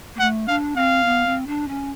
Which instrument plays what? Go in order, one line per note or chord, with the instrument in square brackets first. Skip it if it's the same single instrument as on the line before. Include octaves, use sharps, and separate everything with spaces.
[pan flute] A#3
[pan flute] A3 [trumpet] F#5
[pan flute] D4 [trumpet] F5
[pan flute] C4 [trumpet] F5
[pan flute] B3
C4
D4
C#4